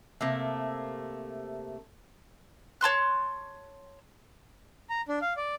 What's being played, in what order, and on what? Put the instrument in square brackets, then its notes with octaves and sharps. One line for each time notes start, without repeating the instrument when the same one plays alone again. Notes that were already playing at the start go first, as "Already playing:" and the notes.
[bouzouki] C3 A3 A#3
[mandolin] C#5 A5 C6 F#6
[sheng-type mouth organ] A#5
D4
F5
D5